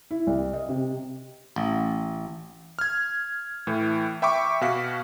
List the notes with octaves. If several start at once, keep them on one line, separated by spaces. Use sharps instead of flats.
E4
C2
D#5
C3
A1
F6 G#6
A2 E3
E5 G5 B5 C#6 D6
B2 F#4 F5 B6